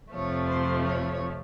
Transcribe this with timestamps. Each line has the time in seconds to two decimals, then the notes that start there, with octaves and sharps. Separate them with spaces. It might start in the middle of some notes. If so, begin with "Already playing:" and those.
0.13 F2 C3 F3 A3 C#5
0.49 C5
0.85 C#5